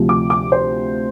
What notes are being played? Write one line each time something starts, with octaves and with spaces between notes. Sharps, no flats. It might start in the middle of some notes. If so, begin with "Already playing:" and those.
Already playing: D2 C3 F3
D6
D6
C5